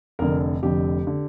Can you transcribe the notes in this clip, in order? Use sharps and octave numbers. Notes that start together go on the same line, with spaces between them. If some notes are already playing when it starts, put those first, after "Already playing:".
F1 F2 D3 A#4
F1 F2 D3 G4
D3